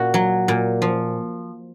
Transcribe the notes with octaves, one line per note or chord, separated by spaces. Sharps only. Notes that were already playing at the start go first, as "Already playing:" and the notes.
Already playing: A#2 F#4
F#3
A#2
F3